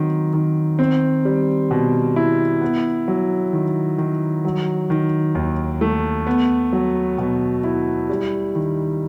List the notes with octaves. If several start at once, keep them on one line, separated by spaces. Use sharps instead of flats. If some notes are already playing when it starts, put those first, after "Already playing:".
Already playing: D#3 F#3 C4
D#3
C4
G3
B2
E4
B3
F#3
D#3
D#3
F#3
D#3
D#2
A3
B3
F#3
B2
E4
G3
D#3